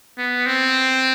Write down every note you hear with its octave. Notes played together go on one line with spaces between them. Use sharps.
B3
C4